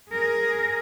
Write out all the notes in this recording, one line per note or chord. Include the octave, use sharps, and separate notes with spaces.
G#4 A#4